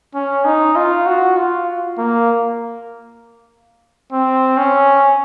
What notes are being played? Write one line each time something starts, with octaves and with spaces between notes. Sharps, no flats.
C#4
D#4
F4
F#4
F4
A#3
C4
C#4